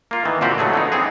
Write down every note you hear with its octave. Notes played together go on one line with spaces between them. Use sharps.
A#3 F4
D#3 E3
A#2 D3 C4 F#4 G4
D3 F#3 A3 G#4
D3 B3 D#4
E3 B3 C4 D#4 G#4